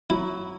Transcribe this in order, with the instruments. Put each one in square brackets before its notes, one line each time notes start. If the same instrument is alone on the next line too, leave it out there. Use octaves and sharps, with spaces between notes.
[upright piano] F#3 [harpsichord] E4